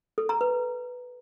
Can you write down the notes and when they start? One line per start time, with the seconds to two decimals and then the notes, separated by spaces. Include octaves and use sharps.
0.18 A4
0.29 A#5
0.41 B4